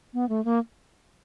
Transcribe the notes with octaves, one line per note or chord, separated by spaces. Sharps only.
B3
A3
A#3